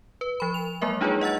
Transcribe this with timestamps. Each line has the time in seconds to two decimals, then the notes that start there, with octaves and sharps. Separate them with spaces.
0.21 B4
0.40 F3 B5
0.54 F7
0.81 F#3 G#3 A#3 A#4 E5
1.01 D4 D#4 F4 G#4 B4 C#5
1.21 D#5 F#5 E6 A6